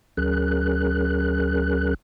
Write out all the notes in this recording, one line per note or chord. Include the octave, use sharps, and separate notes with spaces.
D2 F#3 C#4 G#4 A#4 F#6